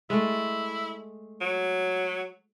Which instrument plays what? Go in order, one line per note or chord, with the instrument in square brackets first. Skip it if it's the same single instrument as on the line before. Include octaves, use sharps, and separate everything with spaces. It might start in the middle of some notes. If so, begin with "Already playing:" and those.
[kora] G#3 A3 [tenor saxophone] E4
[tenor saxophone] F#3